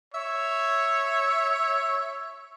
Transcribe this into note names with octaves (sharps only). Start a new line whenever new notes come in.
C#5 E5